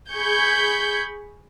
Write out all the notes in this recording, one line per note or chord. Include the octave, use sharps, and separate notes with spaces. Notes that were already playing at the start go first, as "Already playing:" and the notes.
G#4 B5 C#6 G6 G#6